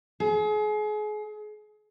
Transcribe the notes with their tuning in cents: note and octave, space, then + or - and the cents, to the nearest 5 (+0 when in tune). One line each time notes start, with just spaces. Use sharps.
G#4 +35